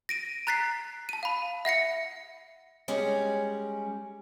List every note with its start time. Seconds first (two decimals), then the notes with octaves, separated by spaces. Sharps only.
0.09 A#6 D7 D#7
0.47 A#5 F#6 A6 B6 C7
1.09 A5 D#7
1.23 F5 B5
1.65 E5 F#5 A#6 C#7
2.88 G3 G#3 C#4